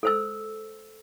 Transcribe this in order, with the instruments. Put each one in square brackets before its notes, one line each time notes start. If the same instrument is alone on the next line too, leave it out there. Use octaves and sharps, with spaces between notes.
[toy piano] A4 C5 E6